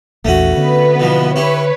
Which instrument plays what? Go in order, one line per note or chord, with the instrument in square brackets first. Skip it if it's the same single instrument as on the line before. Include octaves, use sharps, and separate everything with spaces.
[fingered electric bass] A#1 E2 [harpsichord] A3 C#4 F#4
[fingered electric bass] D3 [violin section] B3 B4
[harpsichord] B2 E3 F3
[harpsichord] E4 G4 [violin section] B4 C#5